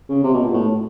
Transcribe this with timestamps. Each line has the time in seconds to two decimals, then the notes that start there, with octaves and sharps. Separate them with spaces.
0.09 C#3
0.24 C3
0.33 B2
0.43 A#2
0.53 A2